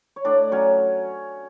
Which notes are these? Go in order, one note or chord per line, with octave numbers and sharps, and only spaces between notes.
C#5
A2 D4 D5
F#3 C#4 C#5